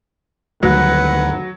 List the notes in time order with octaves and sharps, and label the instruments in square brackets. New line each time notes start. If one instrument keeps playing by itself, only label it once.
[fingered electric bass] D2 G2 D#3 [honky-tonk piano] F#3 [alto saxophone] B4 [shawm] F#5